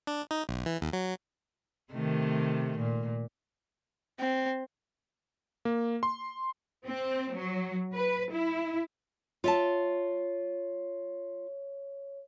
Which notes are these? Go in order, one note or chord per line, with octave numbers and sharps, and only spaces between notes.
D4
D#4
B1
E3
D#2
F#3
C3 D#3 A3
A#2
C4
A#3
C6
C4
F#3
B4
E4
F4 C#5 E5 A5